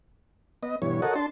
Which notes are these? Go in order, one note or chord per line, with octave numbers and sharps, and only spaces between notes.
B3 D#5
G2 B2 E3 C#5
F#4 A4 A#4 C#5 D#5 F#5
D4 A5 C6